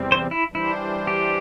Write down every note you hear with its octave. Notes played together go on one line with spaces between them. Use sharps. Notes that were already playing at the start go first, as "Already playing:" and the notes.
Already playing: E2 C3 G3 C4
C5
E4
E3 G3 D4 E4 C5
G4